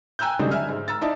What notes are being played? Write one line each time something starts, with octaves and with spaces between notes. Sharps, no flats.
G5 G#5 A#5 E6 F#6 G6
D3 F#3 G3 C#4 D#4
E5 G#5 F6
G#2
A#5 E6 A6
D#4 E4 D5 A5